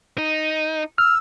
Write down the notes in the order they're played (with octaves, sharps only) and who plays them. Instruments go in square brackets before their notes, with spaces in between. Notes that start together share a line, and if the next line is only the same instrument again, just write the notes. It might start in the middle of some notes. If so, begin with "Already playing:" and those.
[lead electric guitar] D#4
[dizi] E6 [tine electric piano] F6